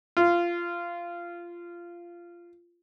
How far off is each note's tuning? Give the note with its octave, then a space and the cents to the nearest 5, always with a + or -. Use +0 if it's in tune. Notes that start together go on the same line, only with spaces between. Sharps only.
F4 -15